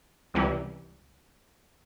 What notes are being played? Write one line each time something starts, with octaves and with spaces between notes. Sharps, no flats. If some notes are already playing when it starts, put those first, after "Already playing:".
C#2 C3 E3 G3